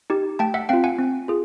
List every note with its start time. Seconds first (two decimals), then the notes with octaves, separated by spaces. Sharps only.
0.10 D#4 G4
0.39 A3 G5 A5
0.54 E5 F#5
0.69 C4 F4 F5 G5
0.84 F#5 G#5
0.99 C4
1.28 F4 G#4